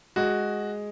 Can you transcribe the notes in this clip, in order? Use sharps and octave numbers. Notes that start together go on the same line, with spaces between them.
G#3 F#4